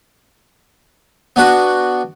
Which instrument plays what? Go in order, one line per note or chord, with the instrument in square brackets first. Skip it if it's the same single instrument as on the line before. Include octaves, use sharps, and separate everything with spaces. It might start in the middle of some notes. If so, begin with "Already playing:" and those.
[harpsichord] B3 D4 F#4